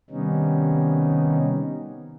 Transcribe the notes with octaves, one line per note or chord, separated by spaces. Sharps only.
C3 D#3 G3 B3 C#4 D#4